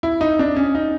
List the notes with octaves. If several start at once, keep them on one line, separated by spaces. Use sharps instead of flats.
E4
D#4
D4
C#4
D#4